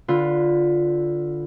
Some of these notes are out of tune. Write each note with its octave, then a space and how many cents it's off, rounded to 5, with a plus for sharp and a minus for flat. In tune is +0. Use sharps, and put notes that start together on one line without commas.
D3 +0 F4 +5 B4 +0